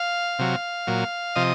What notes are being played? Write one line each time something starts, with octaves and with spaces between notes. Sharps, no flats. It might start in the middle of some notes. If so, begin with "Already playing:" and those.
Already playing: F5
C3 F#3
A#2 F#3
C3 F3 D#5